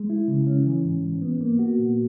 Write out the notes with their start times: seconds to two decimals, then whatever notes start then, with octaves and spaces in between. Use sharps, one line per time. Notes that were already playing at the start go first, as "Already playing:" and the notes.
Already playing: G#3
0.10 E4
0.28 C#3
0.47 C#4
0.66 E3
0.84 G#2
1.03 G#2
1.22 B3
1.41 A#3
1.59 F#4
1.79 A#2